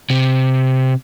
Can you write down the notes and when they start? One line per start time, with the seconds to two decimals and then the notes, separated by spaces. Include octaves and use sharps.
0.10 C3